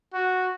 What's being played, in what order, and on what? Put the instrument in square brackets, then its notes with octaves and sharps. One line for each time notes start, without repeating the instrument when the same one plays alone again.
[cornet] F#4